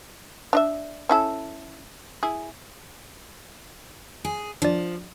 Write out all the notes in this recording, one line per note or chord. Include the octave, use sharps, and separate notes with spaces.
D4 D#5 E5
C#4 E4 A4
E4 G#4
G#4
F3 D4 D5